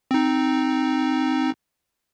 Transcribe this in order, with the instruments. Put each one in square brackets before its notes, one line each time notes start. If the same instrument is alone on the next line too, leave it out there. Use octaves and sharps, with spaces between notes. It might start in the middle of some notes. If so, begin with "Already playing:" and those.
[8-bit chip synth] C4 D#4